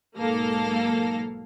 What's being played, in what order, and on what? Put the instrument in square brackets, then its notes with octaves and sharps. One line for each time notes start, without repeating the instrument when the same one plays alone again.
[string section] B1 G#2 A#3 A4 F5 A#6